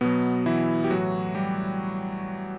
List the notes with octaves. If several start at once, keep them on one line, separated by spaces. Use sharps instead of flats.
B2 F#3 B3
E3 E4
G4
A2 E3 F#3 F#4
G3 G4